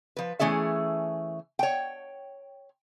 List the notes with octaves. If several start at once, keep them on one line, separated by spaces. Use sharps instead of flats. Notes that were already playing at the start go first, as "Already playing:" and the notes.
F3 B4
E3 A3 C#4 G#4 E5
C#5 G5